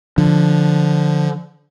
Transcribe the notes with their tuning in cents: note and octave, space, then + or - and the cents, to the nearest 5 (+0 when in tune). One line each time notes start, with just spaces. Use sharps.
D3 +0 F3 +0